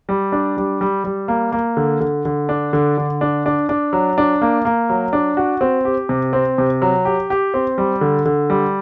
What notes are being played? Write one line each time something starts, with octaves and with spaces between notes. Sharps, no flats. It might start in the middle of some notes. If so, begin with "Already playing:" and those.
G3
D4
G3
G3
G3
A#3
A#3
D3
D3
D3
D4
D3
D3
D4
D4
D4
F#3
D4
A#3
A#3
F#3
D4
F#4
C4
G4
C3
C4
C3
F#3
G4
G4
C4
G3
D3
D3
G3